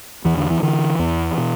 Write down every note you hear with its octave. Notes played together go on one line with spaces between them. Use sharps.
E2 E3
D3
E3
D3 E3
E2
B2